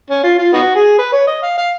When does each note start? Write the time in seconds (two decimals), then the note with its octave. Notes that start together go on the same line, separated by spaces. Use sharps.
0.10 C#4
0.24 F4
0.39 F4
0.53 B3 D#4 F#4
0.75 G#4
0.99 B4
1.12 C#5
1.27 D#5
1.43 F5
1.58 F5